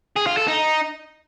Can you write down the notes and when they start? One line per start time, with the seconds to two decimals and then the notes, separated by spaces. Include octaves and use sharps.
0.16 G#4
0.27 F4
0.37 A4
0.48 D#4